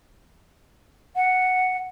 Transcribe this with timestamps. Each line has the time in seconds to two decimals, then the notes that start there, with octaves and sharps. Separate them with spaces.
1.16 F#5